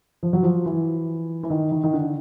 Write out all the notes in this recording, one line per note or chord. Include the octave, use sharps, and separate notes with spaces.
F3
F#3
F3
E3
E3
D#3
D#3
D#3
D3